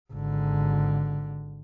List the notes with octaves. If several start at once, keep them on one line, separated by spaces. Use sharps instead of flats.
G#1 D3